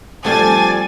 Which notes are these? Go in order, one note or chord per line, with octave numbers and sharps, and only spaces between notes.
F3 G3 A3 C4 D4 G#5 A6